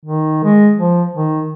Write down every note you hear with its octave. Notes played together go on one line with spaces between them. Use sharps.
D#3
G#3
F3
D#3